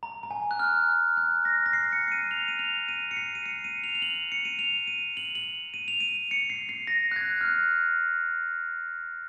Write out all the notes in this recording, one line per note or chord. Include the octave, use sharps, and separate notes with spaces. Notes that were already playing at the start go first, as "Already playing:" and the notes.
A#5
A#5
G#5
F#6
F6
F#6
A#6
A#6
C7
C#7
C#7
D#7
F7
D#7
F7
D#7
C#7
C7
D#7
C#7
D#7
F7
F7
F#7
C#7
D#7
F7
D#7
F#7
F#7
D#7
F7
D#7
C#7
C7
C7
A#6
F#6
G#6
F6
F#6